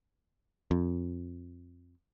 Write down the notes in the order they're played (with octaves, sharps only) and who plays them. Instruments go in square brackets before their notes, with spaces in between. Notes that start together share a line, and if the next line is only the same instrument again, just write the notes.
[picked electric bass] F2